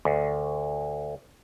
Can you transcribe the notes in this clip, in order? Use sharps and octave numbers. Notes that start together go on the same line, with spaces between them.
D2